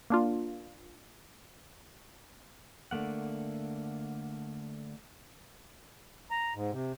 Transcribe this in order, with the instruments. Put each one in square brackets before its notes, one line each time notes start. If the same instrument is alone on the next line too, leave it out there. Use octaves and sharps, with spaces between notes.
[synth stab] A#3 D4 F4
[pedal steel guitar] D3 A3 A#3 F#5
[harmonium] A#5
G#2
C3